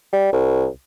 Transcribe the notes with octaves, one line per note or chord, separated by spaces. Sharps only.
G3
C2